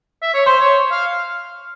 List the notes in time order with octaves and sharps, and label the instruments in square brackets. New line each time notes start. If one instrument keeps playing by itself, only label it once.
[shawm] E5
C#5
[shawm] C5 [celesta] C6
[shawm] C#5
F5